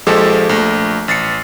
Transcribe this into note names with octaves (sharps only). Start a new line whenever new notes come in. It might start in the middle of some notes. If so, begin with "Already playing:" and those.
A#1 F3 G#3 G4 A4
A#1 A3
A1 A6 C7 C#7